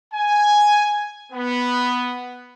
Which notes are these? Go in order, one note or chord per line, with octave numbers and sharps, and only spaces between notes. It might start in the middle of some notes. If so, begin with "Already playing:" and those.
G#5
B3